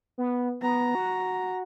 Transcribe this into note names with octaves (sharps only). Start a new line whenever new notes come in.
B3
B3 A#5
F#4